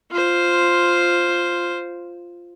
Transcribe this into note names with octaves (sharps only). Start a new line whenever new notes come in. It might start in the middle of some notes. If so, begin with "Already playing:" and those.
F4 C5